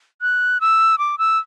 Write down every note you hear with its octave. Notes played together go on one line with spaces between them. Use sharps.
F#6
E6
D6
E6